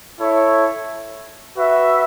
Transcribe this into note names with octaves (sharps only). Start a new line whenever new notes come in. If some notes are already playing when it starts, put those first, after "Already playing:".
E4 A4 C#5 E5
F#4 B4 E5